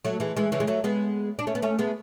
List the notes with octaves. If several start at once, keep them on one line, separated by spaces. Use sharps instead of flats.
F#3 A3
E3 G#3
E3 G#3
C#3 E3
G#3
F#3 A3
G#3 B3
D4
A3 C#4
B3
A3 C#4
G#3 B3